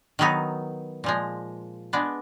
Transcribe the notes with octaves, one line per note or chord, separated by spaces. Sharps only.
D#3 F#3 B3 D#4
A#2 F3 G#3
G#3 B3 D4